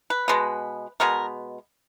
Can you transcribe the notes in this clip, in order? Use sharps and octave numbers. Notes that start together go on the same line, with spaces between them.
B4
B2 G#3 B3
B2 G#3 B3 A#4